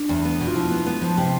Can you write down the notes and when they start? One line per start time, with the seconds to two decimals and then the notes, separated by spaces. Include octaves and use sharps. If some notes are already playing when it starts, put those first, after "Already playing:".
Already playing: D4
0.09 E2
0.25 B3
0.40 B2
0.47 F4
0.55 F3 E4
0.71 B3
0.86 B3
1.02 F3
1.17 C3